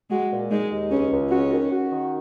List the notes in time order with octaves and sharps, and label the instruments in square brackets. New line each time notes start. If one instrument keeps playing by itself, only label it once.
[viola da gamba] G#3 [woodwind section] F#4
[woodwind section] A#2
[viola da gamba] G#3 [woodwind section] D#4
[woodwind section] D#2
[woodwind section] C#2 [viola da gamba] C#4
[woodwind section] C#2
[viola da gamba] C#4 [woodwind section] F#4
[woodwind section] D#3
F#4
D#3